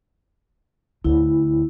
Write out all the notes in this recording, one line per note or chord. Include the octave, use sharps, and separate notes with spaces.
D2 E4